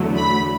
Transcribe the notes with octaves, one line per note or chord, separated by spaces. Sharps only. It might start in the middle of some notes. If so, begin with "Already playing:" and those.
Already playing: E2 D3 F#3 A3
B5